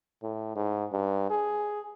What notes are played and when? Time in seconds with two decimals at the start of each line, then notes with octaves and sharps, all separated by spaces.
0.23 A2
0.56 G#2
0.93 G2
1.30 G#4